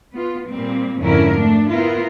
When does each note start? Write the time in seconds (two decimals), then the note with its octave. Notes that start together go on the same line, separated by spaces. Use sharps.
0.14 B3 F4
0.48 A#2 G3 A#3 C4
1.00 F2 G#2 D3 C#4 E4 A#4
1.36 A3 D4
1.70 B3 E4 F4 A#4